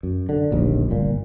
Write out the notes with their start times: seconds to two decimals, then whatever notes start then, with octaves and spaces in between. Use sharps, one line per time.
0.03 F#2
0.29 D3
0.51 D1 A#1 D#2
0.90 D1 G1 A#2